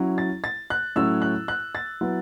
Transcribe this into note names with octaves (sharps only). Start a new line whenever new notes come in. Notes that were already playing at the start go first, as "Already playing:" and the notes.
Already playing: F#3 C#4 E4
A6
A6
F#6
A2 F#3 C#4 E4 E6
F#6
F#6
A6
F#3 B3 E4